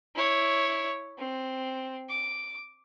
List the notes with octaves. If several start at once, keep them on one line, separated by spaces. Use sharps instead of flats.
E4 C#5
C4
D6